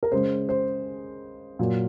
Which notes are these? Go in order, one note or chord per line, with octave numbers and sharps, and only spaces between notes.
A#4
C#3 G#3 C5
C5
A#2 F#3 A#3